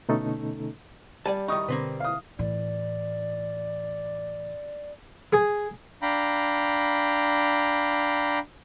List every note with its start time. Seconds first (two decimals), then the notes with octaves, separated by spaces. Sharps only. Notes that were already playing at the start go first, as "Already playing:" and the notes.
0.09 B2 D3 A3 C#4 D#4 A4
1.26 G3 D5 G#5 A5
1.48 D#3 D#4 C#6 D#6
1.68 B2 D3 A#3 C4 B4
2.00 F5 D#6
2.39 A2 E3 D5
5.33 G#4
6.02 D4 F5 G5 A#5 B5